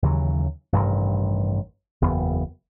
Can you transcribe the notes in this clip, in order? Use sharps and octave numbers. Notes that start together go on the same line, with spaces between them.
D#2 C#3 E3 F#3
A1 G2 C3 D#3
F#1 E2 B3